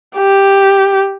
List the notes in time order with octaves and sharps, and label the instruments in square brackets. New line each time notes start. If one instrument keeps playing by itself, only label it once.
[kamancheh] G4